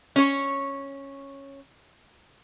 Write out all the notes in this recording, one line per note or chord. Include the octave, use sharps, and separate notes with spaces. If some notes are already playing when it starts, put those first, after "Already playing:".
C#4 C#5